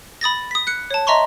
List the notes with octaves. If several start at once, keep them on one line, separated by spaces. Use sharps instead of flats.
B5 D#6 A6 A#6
D#6 B6
F#6 C#7
C#5 A5
D#5 E5 A#5 C6 C#6